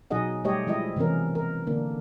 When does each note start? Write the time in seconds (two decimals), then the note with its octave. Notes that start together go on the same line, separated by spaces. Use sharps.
0.11 B2 F#3 D#4 G#4 D#5 F#5
0.44 G3 A3 G4 C#5 D#5
0.67 F3 G#3 E4 D#5
0.96 C3 E3 B3 C#4 A#4
1.35 A#4
1.67 D3 A#3 D4